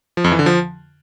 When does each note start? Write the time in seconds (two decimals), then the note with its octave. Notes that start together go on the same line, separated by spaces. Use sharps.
0.17 F3
0.24 F2
0.32 E3
0.39 D3
0.46 F3